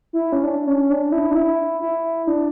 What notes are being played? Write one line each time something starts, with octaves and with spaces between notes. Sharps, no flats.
E4
C#4
D4
C#4
D4
E4
D4
E4
E4
D4